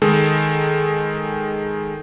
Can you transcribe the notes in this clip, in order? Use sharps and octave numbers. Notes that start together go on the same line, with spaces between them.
D#3 G#3 A4